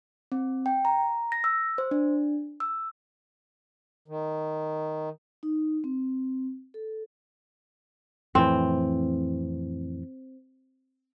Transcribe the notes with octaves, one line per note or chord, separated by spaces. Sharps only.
C4
G5
A#5
A#6
E6
C5
D4
E6
D#3
D#4
C4
A4
F2 A2 E3 C4